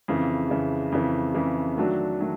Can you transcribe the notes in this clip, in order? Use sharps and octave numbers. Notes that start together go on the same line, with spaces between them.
F2 C#3 E3
F2 C#3 E3
F2 C#3 E3
F2 C#3 E3
D#3 F#3 A3 D4 F#4
D#3 F#3 A3 D4